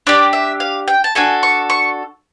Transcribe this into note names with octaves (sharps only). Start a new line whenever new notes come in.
D4 G4 D5
E5
F5
G5
A5
D4 F#4 A4 G#5
C#6
C#6